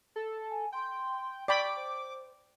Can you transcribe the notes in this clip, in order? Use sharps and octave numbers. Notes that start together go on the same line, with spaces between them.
A4
G#5
G5 C6
D5 G5 B5 C#6 D6
C5